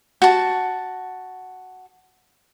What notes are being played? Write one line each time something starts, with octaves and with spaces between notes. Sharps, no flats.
F#4 A5